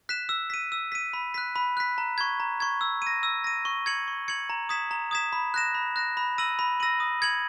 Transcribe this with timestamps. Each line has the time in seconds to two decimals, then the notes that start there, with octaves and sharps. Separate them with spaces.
0.09 F#6 B6 E7
0.29 E6
0.50 B6 D#7
0.72 E6
0.92 B6 D#7
1.13 B5
1.34 F#6 B6
1.56 B5
1.77 F#6 B6
1.98 A#5
2.18 C#6 G#6
2.40 A#5
2.60 C#6 G#6
2.81 E6
3.02 A#6 D#7
3.23 E6
3.44 A#6 D#7
3.65 C#6
3.86 G#6 C#7 F#7
4.08 C#6
4.28 G#6 C#7 F#7
4.50 A#5
4.69 D#6 G#6 B6 E7
4.91 A#5
5.11 D#6 G#6 B6 E7
5.33 B5
5.54 F#6 A#6 E7
5.75 B5
5.96 F#6 A#6 E7
6.17 B5
6.38 E6 A#6 D#7 F#7
6.59 B5
6.80 E6 A#6 D#7 F#7
7.00 D#6
7.22 G#6 C#7 F#7